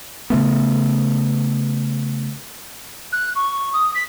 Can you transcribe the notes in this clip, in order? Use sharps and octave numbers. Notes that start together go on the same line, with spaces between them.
C#3 A3 B3
F#6
C#6
D#6
B6